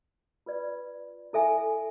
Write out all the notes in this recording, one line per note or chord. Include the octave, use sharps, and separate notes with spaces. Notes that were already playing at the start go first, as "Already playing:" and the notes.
F4 B4 D5
E4 A4 E5 G#5